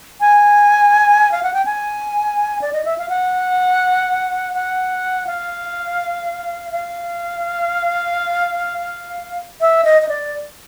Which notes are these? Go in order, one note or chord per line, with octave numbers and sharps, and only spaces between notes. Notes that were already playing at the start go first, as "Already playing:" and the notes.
G#5
F5
F#5
G5
G#5
D5
D#5
E5
F5
F#5
F#5
F5
F5
E5
D#5
D#5
D5